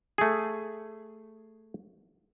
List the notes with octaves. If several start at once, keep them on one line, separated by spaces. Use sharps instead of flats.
A3 G#4